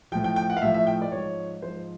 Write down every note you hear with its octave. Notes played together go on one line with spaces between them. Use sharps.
A2 F3 G5
G5
G5
F#5
F5
A2 F3 E5
E5
G5
D5
G#2 F3 C#5
G#2 F3 C5